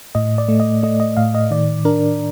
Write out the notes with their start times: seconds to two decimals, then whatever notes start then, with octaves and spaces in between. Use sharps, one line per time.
0.15 A2 D#5
0.38 D5
0.48 A3
0.60 D#5
0.83 A3 D#5
1.00 D#5
1.17 A2 F5
1.35 D#5
1.51 D#3 D5
1.85 D4 A#4